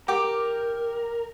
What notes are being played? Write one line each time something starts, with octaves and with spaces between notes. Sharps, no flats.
G4 A#4 G5 D6